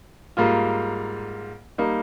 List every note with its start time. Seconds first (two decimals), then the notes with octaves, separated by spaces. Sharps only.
0.37 G#2 G3 A#3 F4
1.78 G3 A#3 D#4